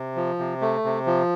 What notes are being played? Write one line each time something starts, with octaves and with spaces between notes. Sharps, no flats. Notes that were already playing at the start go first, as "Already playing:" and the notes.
Already playing: C3
F3
C3
A3
C3
F3